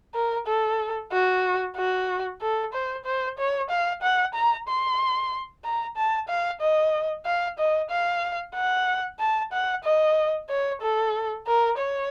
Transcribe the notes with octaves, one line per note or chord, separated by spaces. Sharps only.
A#4
A4
F#4
F#4
A4
C5
C5
C#5
F5
F#5
A#5
C6
A#5
A5
F5
D#5
F5
D#5
F5
F#5
A5
F#5
D#5
C#5
A4
A#4
C#5